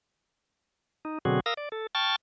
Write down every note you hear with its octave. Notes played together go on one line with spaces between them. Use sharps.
D#4
B2 D3 F#3 C4 F#4 G#4
A#4 F5 D#6 E6 A#6
D5
A4
G5 A5 C#6 F6 A6